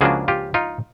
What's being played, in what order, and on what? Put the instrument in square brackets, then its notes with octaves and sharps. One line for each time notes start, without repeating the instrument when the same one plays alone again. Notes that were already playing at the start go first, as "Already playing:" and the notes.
[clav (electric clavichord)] C#2 C#3 F3 A#3 D4 F#4 G#4
F4 G4
D#4 F4